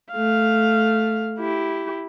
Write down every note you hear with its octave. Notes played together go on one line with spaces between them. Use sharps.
A3 F5
E4 G4